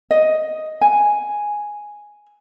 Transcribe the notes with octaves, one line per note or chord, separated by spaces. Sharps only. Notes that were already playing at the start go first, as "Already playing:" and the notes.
D#5
G#5